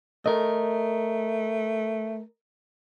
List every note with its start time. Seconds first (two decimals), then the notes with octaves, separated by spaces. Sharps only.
0.26 A3 A#4 D#5